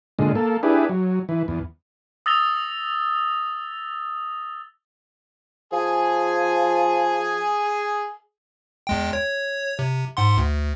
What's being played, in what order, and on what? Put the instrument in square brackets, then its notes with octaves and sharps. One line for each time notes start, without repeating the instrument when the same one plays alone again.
[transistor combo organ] A#2 D3 G#3
A#3 A4
D4 E4 G4 G#4 B4
F#3
E3
E2
[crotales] D#6 E6 A6 A#6 F7 G7
[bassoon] F3 [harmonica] G#4 G#5
[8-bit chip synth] E2 G#3 G5
C#5
C3
G#2 F#5 C6
D2